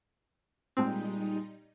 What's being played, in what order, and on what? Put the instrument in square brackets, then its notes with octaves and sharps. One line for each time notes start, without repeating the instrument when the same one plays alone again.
[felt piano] A#2 G#3 G5 [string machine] G3 D#4 [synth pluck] C4